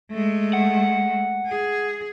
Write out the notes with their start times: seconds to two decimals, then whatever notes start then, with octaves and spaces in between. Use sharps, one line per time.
0.12 G#3 A3
0.53 F#5
1.47 G#4